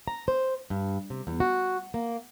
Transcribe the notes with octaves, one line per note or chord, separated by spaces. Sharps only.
A#5
C5
G2
C3
E2
F#4
A#3